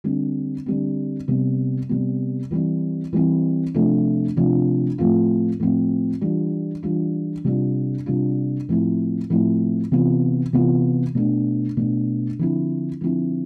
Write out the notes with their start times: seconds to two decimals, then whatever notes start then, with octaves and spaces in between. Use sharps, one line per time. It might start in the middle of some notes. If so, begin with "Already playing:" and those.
0.04 D3 G3 C4
0.66 D3 G3 C4
1.28 C3 G3 B3
1.89 C3 G3 B3
2.51 E3 G3 C4 E4
3.13 E3 G3 C4 E4
3.74 C3 F3 A3 D4 F4
4.37 C3 F3 A3 D4 F4
4.98 A2 F3 C4 F4
5.60 A2 F3 C4 F4
6.21 E3 G3 D4 F4
6.83 E3 G3 D4 F4
7.44 C3 G3 D4 F4
8.06 C3 G3 D4 F4
8.69 A2 F3 C4 E4
9.30 A2 F3 C4 E4
9.92 C3 E3 B3 F4
10.53 C3 E3 B3 F4
11.15 B2 A3 D4
11.77 B2 A3 D4
12.39 D3 F3 C4 E4
13.01 D3 F3 C4 E4